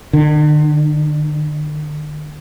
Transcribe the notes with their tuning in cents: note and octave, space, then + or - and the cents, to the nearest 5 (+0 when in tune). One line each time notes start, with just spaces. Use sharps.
D3 +45